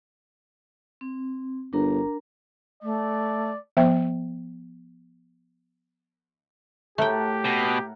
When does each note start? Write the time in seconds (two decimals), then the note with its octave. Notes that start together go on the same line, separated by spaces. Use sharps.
1.01 C4
1.73 G1 D4 A#4 A#5
2.83 A3 D5
3.77 F3 B3 C5 E5 G5
6.98 A2 A3 G4 A#4 F#5 G5
7.45 B2